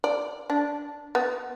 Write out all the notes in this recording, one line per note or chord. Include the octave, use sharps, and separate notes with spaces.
D5
D4
B3